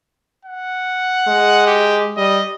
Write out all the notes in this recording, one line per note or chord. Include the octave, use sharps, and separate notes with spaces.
F#5
G#3
G4
G3 D#5